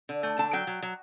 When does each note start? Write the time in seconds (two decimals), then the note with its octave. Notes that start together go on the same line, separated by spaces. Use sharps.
0.09 D3
0.23 A3
0.38 D3 A5
0.53 F#3 G5
0.67 F#3
0.83 F#3